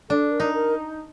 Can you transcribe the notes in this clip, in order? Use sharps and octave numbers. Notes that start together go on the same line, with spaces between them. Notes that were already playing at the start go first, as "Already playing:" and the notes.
D4 A4
A#4
D#4
A#4